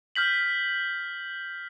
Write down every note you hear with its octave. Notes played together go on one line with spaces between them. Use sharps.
F6 G6 B6 F#7